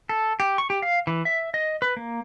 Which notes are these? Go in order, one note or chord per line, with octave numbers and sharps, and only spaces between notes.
A4
G4
C#6
G4
F5
E3
E5
D#5
B4
A#3